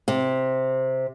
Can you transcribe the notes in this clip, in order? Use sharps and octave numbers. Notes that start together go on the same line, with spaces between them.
C3